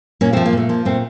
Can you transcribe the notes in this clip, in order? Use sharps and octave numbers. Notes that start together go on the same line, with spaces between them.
A#2 A#3 C#4
A3 C4
F3
A#3
A#2 A3
F3 A#3
A#2 A3 C4